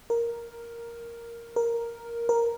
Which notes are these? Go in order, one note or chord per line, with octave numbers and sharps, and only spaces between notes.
A#4
A#4
A#4